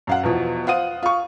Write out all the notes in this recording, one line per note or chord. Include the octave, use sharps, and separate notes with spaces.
F#2 F5 F#5
E2 B2 F3
F4 C5 F#5 D#6 D#7
F4 C#6